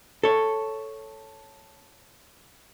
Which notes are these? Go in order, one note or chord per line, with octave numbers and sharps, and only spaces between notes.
A4 C#5